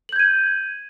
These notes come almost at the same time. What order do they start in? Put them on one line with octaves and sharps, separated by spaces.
F#7 G6 G#6 D#7